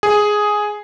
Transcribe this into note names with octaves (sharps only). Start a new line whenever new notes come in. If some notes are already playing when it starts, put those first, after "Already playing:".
G#4